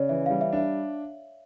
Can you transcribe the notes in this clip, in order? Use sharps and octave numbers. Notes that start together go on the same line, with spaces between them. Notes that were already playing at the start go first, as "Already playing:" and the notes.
Already playing: C#3 C#5 D5
E3 E5
G3 F5
E5
D4 E5